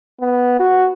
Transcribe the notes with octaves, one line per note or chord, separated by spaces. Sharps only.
B3
F#4